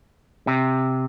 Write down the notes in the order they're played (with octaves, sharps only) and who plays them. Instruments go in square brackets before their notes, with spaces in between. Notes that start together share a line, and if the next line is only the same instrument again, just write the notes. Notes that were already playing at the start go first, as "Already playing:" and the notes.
[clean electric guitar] C3